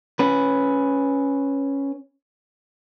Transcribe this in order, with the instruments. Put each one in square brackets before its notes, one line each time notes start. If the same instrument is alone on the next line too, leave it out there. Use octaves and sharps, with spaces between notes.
[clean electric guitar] C#4 B4